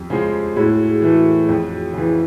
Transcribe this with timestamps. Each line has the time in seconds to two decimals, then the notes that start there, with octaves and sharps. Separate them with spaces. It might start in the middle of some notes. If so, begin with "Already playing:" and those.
Already playing: F2 F4 G4
0.10 C#3 F3 G#3
0.56 A2 F#4 G#4
1.02 E3 A3
1.49 F2
1.94 C#3 E3